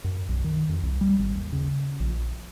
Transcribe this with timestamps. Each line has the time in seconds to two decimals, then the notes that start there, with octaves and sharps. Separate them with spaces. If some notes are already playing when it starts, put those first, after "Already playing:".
0.04 F#2
0.29 B1
0.44 D#3
0.69 F2
0.83 C2
1.01 G3
1.19 G#1
1.35 D#2
1.52 C#3
2.00 A#1